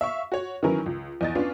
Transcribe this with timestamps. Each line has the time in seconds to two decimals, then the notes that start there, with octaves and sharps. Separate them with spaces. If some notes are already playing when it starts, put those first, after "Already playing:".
0.01 E5 F5 C#6
0.32 F#4 C#5
0.63 D#3 E3 F#3 C#4 A#4 B4
0.86 C#2
1.21 E2 D#5 A6
1.35 B3 C#4 D4 F4